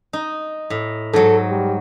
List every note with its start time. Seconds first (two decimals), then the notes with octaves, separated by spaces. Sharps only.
0.13 D#4
0.70 A2
1.13 G#2 F#3 A4
1.49 G3